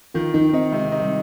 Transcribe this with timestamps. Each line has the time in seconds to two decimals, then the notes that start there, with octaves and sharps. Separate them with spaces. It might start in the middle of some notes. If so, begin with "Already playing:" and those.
0.14 D#3 F4
0.34 D#3 D#4
0.53 C4 D#4
0.72 C3 G#3
0.92 D#4
1.02 G3